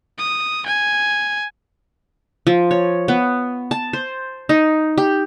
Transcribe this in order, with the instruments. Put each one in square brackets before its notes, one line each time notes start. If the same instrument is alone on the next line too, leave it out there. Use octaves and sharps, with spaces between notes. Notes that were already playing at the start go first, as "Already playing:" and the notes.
[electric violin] D#6
G#5
[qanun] F3
C#5
B3
A5
C5
D#4
G4